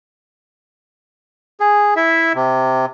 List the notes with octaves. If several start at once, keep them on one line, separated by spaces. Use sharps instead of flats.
G#4
E4 E5
C3